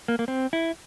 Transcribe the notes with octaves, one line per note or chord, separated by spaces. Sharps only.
A#3
A#3
C4
E4